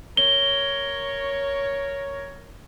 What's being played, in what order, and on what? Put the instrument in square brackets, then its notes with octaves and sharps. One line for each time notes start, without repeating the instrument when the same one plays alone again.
[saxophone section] A#4 C#5 [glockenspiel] G7